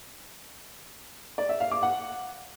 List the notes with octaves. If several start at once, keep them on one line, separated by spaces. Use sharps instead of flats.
D5
E5
F5
D6
F#5